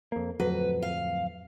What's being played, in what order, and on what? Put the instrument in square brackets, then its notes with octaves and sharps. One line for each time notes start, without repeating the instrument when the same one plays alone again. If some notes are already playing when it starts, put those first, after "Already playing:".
[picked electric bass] F2 A#3
[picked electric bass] D1 F2 F#3 [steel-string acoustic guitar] B4
[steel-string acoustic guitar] F5